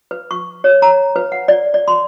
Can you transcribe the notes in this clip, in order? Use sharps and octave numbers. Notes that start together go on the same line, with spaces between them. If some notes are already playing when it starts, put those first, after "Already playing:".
B4
C#6
C#5
A#5
B4
F#5
D5
D5
C6